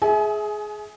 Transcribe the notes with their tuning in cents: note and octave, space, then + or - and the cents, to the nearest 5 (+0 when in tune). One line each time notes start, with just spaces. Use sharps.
G#4 +15 E5 -20 G#5 +35